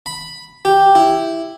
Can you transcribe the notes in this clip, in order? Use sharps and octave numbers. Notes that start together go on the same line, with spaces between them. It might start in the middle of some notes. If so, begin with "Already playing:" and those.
B5
G4
E4